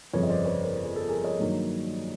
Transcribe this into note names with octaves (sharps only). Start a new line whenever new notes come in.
G1 F2 C#3 B4 C#5
D#5
C5 D5
B4 C#5
A#4 C5
G#4
A4
G#4 A#4
C#5 D#5
G2 D#3 F#3 A#3